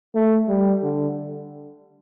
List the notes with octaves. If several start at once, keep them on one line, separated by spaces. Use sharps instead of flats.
A3
G3
D3